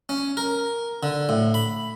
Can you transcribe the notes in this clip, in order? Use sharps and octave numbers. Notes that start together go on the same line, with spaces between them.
C#4
A#4
D3
A2
B5